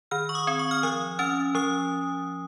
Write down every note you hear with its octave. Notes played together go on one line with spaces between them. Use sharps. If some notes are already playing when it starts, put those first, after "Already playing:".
D#3 F6
C#6
D#6
C4
C#6
F6
F3 D#6
C#4 F6
F3 D#6